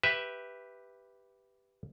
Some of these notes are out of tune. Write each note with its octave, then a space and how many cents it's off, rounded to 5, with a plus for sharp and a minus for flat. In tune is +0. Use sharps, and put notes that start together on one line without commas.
G4 +0 B4 +0 E5 +0